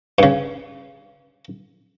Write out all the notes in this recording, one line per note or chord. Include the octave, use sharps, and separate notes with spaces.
G2 C#3